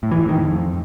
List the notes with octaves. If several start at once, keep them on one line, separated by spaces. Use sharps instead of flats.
A2
E3
A2
D#3
F2